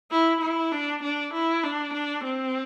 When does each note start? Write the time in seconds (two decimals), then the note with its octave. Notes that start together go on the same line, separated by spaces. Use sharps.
0.11 E4
0.41 E4
0.72 D4
1.03 D4
1.34 E4
1.64 D4
1.94 D4
2.25 C4